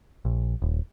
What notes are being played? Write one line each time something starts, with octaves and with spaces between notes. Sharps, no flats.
A#1
D#1